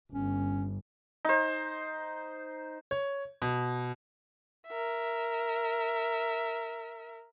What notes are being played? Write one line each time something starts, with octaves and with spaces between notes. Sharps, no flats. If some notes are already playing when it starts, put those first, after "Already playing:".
G1 C#4
D#4 C5
C#5
B2
A#4 E5